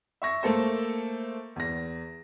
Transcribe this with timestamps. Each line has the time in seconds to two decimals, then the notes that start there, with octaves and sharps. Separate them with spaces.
0.22 E5 C#6 A#6
0.43 A3 A#3 A4 C5
1.56 E2 A#6